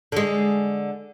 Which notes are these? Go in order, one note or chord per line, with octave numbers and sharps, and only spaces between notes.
D3 G#3